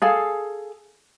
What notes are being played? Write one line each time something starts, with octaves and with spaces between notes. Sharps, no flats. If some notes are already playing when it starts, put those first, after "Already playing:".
G#4 A4 F5